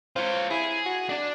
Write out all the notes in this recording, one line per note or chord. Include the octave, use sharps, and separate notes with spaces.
F4 C5 C#5
E4 G#4
F#4
D4 D5